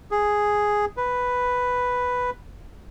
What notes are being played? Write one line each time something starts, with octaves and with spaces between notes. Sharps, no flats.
G#4
B4